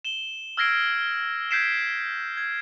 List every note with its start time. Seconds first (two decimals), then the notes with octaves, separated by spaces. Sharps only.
0.05 E7 G7
0.57 E6 F6 G#6 A#6 C7 D7
1.51 G6 G#6 B6 C7 D7 E7
2.37 G#6